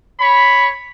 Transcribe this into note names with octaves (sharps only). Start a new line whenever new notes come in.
C#5 B5